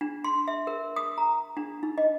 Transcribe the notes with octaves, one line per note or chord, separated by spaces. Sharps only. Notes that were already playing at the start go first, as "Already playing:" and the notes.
D4
C6
E5
A#4
D#6
A#5
D4
D#4
D#5